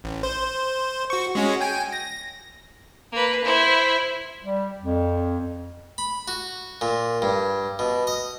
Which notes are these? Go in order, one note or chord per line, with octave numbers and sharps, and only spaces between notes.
A1
C5
F#4 C#6
G#3 C#4 F#4
G5 G#5
A#6
A#3 B4
E4 C5
G3
F2
B5
F#4
A#2
G2
B2
D#5